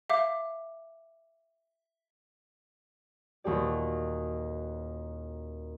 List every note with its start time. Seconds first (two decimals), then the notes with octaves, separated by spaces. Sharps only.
0.09 E5 F5 D6
3.44 D#1 D#2 F#4 G4 D5